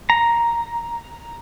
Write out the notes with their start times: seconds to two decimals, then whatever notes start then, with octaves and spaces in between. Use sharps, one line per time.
0.10 A#5